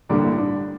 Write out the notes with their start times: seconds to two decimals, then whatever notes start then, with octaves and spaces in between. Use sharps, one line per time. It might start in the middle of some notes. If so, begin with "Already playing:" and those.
0.09 A1 G2 D3 G3 A#3 D4
0.24 E4
0.38 D4